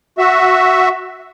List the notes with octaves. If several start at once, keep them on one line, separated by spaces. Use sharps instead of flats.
F#4 E5